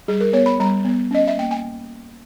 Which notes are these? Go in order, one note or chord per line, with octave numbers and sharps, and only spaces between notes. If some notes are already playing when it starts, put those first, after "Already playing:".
G3 G#4
A#4
B3 C#5
B5
G3 A#5
B3
C#4 D#5
E5
A#3 G5
G#5